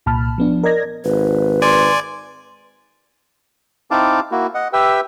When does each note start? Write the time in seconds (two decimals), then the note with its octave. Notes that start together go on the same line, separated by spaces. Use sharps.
0.06 C2 A#2 A5 B5 F6
0.38 F3 B3 D4
0.63 A#4 D5 D#5 G#6 A#6
1.04 G#1 B4
1.62 D5 G#5 C6
3.91 C4 D#4 E4 F5 A5 D6
4.31 A#3 E4 F#4
4.54 D#5 F#5
4.73 G4 B4 E5 G5 E6